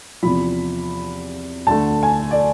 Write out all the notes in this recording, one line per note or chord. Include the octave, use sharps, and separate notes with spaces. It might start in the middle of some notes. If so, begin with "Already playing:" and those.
E2 C3 F3 B5
D2 D3 A3 A5
G#5
D5